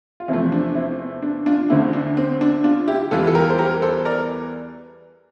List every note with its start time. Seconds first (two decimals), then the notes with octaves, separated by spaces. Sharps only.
0.20 F4
0.28 E2 C3 F3 A3 C4 E4
0.52 D4
0.75 C4 E4
0.99 C4
1.22 D4
1.46 D4 F4
1.70 D2 D3 A3 C4 E4
1.93 D4
2.17 C4
2.41 D4
2.64 D4 F4
2.88 E4 G4
3.11 E2 E3 G3 F4 A4
3.27 A4
3.34 G4 A#4
3.50 C5
3.58 G4 A#4
3.82 A4 C5
4.05 A#4 D5